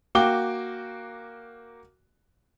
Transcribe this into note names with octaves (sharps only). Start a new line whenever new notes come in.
A#3 F#4 G5 D6 G7